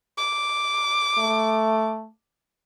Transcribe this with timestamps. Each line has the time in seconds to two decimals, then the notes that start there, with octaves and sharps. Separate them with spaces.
0.18 D6
1.18 A3